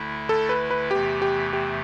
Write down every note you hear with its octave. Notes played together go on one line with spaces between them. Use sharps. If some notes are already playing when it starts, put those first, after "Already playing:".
Already playing: D2 D3 A3 E4
A4
B4
B4
E2 C3 E3 A3 G4
G4
G4